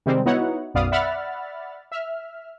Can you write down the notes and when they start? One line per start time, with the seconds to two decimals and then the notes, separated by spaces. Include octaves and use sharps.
0.06 C3 D#3 G3 G#3 C4
0.26 B3 D#4 E4 F#4 C#5 F#5
0.74 B1 F#2 B3 D5 F5 D#6
0.92 D5 E5 F#5 B5 F6 A6
1.92 E5 F6